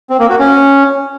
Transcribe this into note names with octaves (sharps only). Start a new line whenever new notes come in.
C4
A#3
F#4
C#4